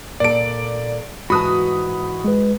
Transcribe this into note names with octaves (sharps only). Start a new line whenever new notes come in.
A#2 A4 D5 D7
G#2 E3 F#4 A5 B5 D#6 F#6
G#3 B4